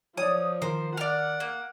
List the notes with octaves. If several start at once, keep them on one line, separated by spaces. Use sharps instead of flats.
F3 C#5 D5 D#6
D#3 A#4 C5
D5 F#5 F6
A#3